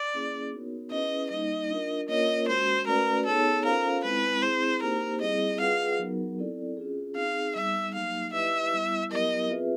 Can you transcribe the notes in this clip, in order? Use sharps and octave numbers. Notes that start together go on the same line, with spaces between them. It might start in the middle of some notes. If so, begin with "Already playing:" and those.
Already playing: D5
A#3 C#4 E4 G#4
B3 D#4 F#4 A#4 C#5
C#4 E4 G#4 B4 D#5
G3 A#3 D#4 D#5
D4 F4 A#4
A#3 C#4 F4 A#4 C#5 D#5
G#3 C#4 F#4 C5
A3 C#4 F#4 A#4 B4 D5
B3 D#4 G#4 A4 C#5
C#4 F4 A4 A#4 C5 F5
G#3 C4 E4 B4
C4 E4 G#4 C5
A#3 D#4 G4 A#4 C5
G3 C4 E4 G#4 D#5
F4 G#4 B4 D#5 F5 F#5
F#3 B3 D#4 F#4 A#4
C4 E4 A4 D5
C#4 F4 G#4
C4 D#4 G#4 F5
G3 B3 D#4 E5
F#3 A#3 D#4 G4 F5
E4 G4 B4 D#5 E5
G3 B3 E4
F#3 B3 E4 G4 A#4 D#5
C4 F4 G#4 B4 E5